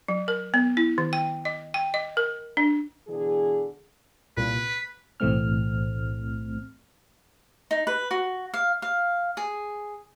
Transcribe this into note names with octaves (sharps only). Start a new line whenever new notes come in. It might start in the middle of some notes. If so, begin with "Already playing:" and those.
F#3
A#4
B3
E4
D#3
G5
D#5
G5
D#5
A#4
D4
B2 D3 E3 G#4
C2 A#2 B4
B6
B1 A2 E3 A3 C4 F6
D#4
B4
F#4
F5
F5
G#4